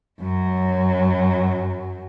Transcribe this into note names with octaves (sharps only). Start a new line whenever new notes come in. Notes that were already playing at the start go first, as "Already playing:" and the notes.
F#2 F#3